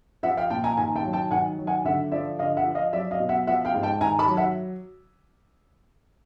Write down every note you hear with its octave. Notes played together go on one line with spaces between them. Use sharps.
F3 E5 F#5
F5 G5
A#2 G5 A5
G#5 A#5
D#3 G#5 A#5
G5 A5
F#3
G5 A5
D#3 F#5 G#5
F#3
F#5 G#5
D3 E5 F#5
F3 D5 E5
D3 D#5 F5
E5 F#5
F3
D#5 F5
F#3 D5 E5
D#5 F5
B2
E5 F#5
F3 E5 F#5
F5 G5
G#2
G5 A5
D#3 G#5 A#5
A5 B5
F#3
E5 F#5